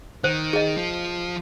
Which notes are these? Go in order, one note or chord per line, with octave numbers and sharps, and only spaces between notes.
D#3 C5
G#4 D#5
F3